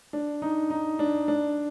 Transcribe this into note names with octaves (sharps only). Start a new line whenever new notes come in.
D4
D#4
D#4
D4
D4